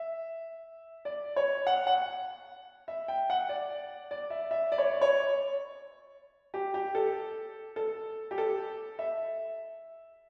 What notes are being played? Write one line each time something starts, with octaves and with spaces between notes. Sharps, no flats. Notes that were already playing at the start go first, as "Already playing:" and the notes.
Already playing: E5
D5
C#5
F#5
F#5
E5
G5
F#5
D5
D5
E5
E5
D5
C#5
D5
C#5
G4
G4
A4
A4
G4
A4
E5